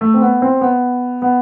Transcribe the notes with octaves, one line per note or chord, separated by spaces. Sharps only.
A3
C4
B3
C4
B3
B3